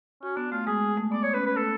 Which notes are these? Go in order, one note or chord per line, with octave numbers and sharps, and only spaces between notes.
C#4 F#4
B3 D4
A3 F4
G#3 G#4
A3
B3 D5
C#5
C#4 B4
B4
A3 A4